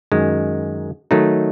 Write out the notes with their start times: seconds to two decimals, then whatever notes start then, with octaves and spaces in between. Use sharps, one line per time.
0.12 F#2 D#3 G#3
1.11 D#3 F#3 A3 D#4